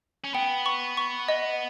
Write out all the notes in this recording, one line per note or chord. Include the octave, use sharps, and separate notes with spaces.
C#4
B3 G5
C#6
C#6
D#5